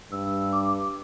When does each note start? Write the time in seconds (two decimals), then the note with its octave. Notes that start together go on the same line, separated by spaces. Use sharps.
0.12 G2 E6
0.53 D6